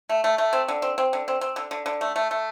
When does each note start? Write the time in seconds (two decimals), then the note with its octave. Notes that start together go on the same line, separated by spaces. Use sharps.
0.09 A3
0.24 A3
0.38 A3
0.53 C4
0.68 D3
0.82 C4
0.98 C4
1.13 D3
1.28 C4
1.41 C4
1.56 D3
1.71 D3
1.86 D3
2.01 A3
2.16 A3
2.31 A3